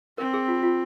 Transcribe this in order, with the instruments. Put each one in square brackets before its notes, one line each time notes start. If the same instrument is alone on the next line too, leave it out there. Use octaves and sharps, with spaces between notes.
[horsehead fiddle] C4 [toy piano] A#4
[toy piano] G#4
F4
F4